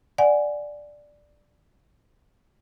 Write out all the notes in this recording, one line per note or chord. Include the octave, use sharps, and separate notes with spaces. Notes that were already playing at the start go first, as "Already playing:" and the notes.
D5 F#5 G#5